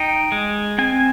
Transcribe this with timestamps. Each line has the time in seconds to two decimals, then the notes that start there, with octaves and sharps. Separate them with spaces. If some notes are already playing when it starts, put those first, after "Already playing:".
Already playing: D#4 G5
0.32 G#3
0.78 C4 G#5